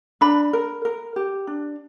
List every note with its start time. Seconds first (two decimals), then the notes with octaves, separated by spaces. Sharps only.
0.21 D4 B5
0.53 A#4
0.85 A#4
1.16 G4
1.47 D4